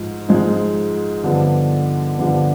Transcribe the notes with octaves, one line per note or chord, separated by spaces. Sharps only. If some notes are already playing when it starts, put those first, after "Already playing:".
Already playing: G#2 F3
G#2 F3 G#3
G2 D3 F3 B3
G2 D3 F3 B3